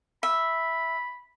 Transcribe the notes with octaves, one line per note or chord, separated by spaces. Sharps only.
E5 B5